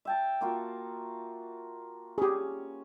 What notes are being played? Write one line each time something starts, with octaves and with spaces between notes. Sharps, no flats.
E5 G5 A5
A#3 F4 F#4
C#4 G4 G#4